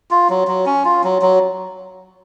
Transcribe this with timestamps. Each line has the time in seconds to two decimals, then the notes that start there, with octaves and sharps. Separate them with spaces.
0.11 F4
0.30 F#3
0.48 F#3
0.66 C#4
0.85 F4
1.04 F#3
1.22 F#3